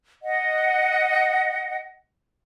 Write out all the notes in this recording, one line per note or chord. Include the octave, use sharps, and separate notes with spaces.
D#5 F#5